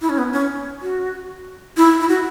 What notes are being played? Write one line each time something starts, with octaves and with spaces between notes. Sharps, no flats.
E4
C#4
B3
C#4
F#4
E4
E4
F#4